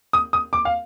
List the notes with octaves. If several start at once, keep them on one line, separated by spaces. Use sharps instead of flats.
D#6
D#6
D6
F5